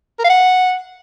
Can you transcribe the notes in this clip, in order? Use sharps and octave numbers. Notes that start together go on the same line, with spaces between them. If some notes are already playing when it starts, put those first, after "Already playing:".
A#4
F5
F#5